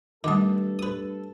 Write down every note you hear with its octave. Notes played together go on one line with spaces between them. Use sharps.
G2 D#3 G3 A3 A4 A5 D6
B4 D#6